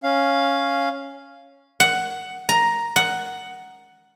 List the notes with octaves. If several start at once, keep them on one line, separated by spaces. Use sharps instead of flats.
C#4 F5
F#5
A#5
F#5